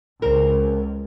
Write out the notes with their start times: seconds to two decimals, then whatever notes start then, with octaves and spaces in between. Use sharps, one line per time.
0.22 C#2 C4 A#4